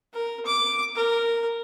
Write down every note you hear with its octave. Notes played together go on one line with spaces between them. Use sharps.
A#4
D6
A#4